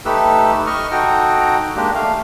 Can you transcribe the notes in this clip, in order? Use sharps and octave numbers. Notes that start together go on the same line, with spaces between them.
A3 D#4 G4 A4 B4 E6
D#5 C#6 F6
D#4 F#4 A4 G5 A#5
G#3 A#3 D4 G4
A3 F5